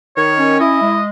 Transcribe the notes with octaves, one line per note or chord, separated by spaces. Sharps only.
D#3 C#5
C#4
E4 D#5
G#3